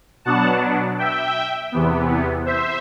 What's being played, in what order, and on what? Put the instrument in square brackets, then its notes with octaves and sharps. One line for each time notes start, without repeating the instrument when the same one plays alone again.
[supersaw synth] B2 F#3 B3 D4 F#5 A5
E5 G5
E2 C3 E3 B3
C5 E5